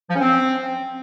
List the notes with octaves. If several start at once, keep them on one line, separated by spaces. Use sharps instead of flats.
F3
C#4
C4